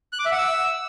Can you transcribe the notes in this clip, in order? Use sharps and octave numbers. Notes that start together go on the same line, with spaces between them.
F#6
D6
E5
F#5
E6